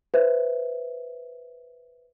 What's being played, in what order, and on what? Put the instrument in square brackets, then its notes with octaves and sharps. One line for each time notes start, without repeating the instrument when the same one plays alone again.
[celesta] B4 C5 E5